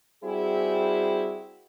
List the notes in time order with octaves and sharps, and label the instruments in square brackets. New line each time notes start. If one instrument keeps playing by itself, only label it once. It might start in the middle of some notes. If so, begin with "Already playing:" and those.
[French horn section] G3 C4 E4 F#4 G#4